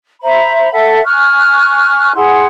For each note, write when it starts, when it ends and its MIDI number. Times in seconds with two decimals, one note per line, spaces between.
0.22 0.71 72
0.22 0.71 76
0.22 0.71 82
0.22 0.71 83
0.72 1.04 69
0.72 1.04 76
0.72 1.04 78
1.04 2.11 80
1.04 2.11 85
1.04 2.11 89
1.04 2.11 90
2.15 2.46 64
2.15 2.46 68
2.15 2.46 78
2.15 2.46 84